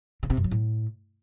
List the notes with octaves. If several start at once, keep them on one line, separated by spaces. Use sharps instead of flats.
C#3
C3
F#2
F#3
A2